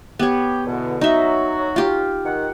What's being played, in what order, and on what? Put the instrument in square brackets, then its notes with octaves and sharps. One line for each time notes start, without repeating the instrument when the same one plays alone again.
[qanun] B3 C#5 [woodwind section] G4
[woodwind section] E2 B2 D3
[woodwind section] F#3 F#4 [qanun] D#4 E5
[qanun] F4 G4
[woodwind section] D#3 F#5